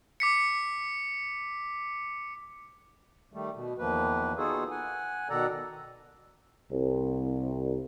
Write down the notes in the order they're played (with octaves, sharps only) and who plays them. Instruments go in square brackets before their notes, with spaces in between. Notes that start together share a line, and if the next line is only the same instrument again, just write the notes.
[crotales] D6 B6 C#7
[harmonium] D#3 G3 A3
B2
E2 D#3 F3 A#3 B4
B3 D#4 F4 F#4 G#4 A4
F#5 G#5
B2 D#3 A4 D5 F#5 A#5
[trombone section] C2